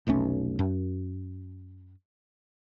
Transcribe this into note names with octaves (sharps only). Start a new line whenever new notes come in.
F1 B1 A3 C#4
F#2